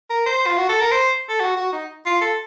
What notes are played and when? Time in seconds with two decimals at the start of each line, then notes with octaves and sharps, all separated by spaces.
0.10 A#4
0.26 C5
0.46 F4
0.58 F#4
0.69 A4
0.80 A#4
0.91 C5
1.29 A4
1.40 F#4
1.56 F#4
1.72 D#4
2.06 F4
2.21 A4